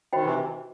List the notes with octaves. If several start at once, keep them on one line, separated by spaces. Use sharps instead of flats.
D#3 F#4 C5 D#5 G5 B5
C3 E3